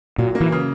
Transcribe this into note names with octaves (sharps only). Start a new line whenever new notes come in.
A#2 F#3
A#3
E3
C#3